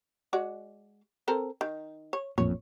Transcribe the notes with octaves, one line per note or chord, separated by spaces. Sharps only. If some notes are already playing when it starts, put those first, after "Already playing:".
G#3 F#4 D5
C4 A4 A#4
D#3
C#5
A1 F2 A#2 C#5